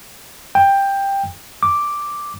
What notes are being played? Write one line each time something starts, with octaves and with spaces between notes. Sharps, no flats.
G5
D6